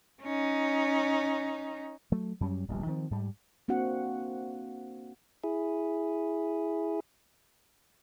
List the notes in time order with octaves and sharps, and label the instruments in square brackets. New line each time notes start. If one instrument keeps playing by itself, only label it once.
[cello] C#4 D#4
[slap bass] F#3 A3
F#2 F#3 G3 C#4
D1 A#1 B2 G3
D#3 F3 C4
G#2 G3
[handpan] A#3 C4 D4 F#4 F#5
[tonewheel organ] E4 G#4